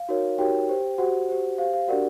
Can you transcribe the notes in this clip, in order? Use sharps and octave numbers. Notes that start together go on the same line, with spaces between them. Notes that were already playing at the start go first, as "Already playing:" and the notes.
Already playing: F5
D#4 F#4 A#4 C#5
D#4 F#4 G4 A#4 C#5 G5
G4 C5
F#4 G4 C5 F#5
G4 C5
G4 C5 F5
F5
D4 F#4 G4 A#4 D5 F#5